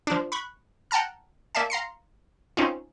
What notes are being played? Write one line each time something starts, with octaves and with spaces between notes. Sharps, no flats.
F3 D4
B5 C#6 F#6
F#5 G5 A5 A#5 F6
A#3 D5 E5 F5 A5
F5 A#5 C6 C#7
C4 C#4 D#4 F4